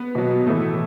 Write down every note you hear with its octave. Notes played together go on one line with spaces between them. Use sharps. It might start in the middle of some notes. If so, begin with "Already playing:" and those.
Already playing: B3
B2 F#3
A2 E3 A3